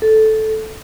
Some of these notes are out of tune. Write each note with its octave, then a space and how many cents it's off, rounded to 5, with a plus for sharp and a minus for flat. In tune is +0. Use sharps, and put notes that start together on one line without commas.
A4 -10